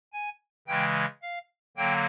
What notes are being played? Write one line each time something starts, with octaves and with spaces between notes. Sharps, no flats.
G#5
C#3 E3 G#3 G5
F5
D3 F#3 A#3 G5